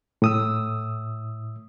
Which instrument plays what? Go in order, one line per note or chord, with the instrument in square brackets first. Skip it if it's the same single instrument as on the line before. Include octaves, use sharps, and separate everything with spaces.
[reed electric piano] A2 D#6 E6